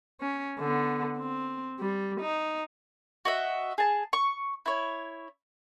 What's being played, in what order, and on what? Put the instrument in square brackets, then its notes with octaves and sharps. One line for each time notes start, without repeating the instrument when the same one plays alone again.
[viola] C#4
D3 B3
C4
G3
D#4
[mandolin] F#4 D#5 E5
G#4 A5
C#6
E4 C#5